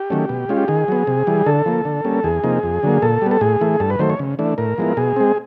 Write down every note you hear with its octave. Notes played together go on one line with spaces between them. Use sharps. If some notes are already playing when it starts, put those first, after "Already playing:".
Already playing: G4
D#3 F#3 A3 C#4
B2
G#3 C#4 F4
G4
D#3 G#4
F#3 B3
C3
E3 G3
D3 A4
F3 A#3
D3
G3 A#3 C#4
E2 G#4
C3 F3 A#3 D#4
F2
D3 F#3 A#3
A#2 A4
G3 B3
A4
A2 G#4
E3 A3
G2 A4
B4
D#3 F#3 A3 C5
C#5
C#3
E3 A3 D4
A2 A#4
F3 G#3 B3 E4
B2 G#4
G#3 C4